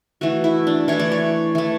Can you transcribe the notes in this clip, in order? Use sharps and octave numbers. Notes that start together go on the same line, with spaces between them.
E3 A3 F#4
E4
D4
E3 A3 C#5
D5
C#5
E3 A3